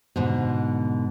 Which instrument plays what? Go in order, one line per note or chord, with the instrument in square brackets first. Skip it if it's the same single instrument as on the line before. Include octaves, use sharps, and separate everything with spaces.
[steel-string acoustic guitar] G#2 B2 D3